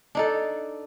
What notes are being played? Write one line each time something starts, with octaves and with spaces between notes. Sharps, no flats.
D4 D#4 A4